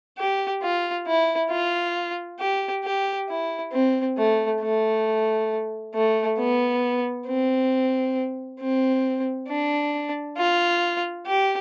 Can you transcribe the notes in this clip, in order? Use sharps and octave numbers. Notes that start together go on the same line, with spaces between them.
G4
F4
E4
F4
G4
G4
E4
C4
A3
A3
A3
B3
C4
C4
D4
F4
G4